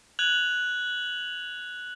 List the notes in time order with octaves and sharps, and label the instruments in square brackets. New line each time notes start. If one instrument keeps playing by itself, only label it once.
[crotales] F#6 G#6 F7 F#7